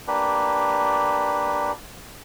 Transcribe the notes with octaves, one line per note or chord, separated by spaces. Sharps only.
A#3 D4 G4 B4